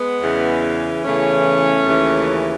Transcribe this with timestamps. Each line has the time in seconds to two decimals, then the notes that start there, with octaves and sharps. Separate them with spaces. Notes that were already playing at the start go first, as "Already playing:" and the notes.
Already playing: G#3 B3
0.21 E2 C#3 E3
1.04 E2 C#3 E3 A3 C#4
1.85 D#2 C#3 E3